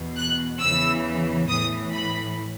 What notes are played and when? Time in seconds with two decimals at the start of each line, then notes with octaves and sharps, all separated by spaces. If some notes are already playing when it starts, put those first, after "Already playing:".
Already playing: E2 B2
0.17 F#6
0.62 E2 C#3 E3 E6
1.50 A2 E3 D#6
1.94 B5